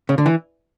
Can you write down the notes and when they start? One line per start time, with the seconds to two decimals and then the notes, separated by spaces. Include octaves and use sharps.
0.09 C#3
0.18 D3
0.26 E3